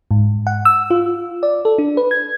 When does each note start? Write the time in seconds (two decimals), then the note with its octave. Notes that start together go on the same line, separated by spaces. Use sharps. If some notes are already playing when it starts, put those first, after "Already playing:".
0.11 G#2
0.47 F#5
0.65 E6
0.90 F4
1.43 D5
1.65 A4
1.78 D4
1.97 B4
2.11 G#6